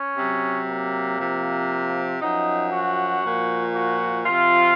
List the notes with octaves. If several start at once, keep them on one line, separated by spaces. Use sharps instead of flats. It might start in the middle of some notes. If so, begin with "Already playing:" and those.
Already playing: C#4
C3 F#3
A#3
C3 F3
F#2 F3 D#4
F#4
A#2 F3
F#4
C3 F3 F4